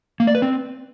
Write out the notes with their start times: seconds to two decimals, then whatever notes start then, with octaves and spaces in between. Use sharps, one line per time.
0.20 A#3
0.27 D5
0.35 B4
0.42 C4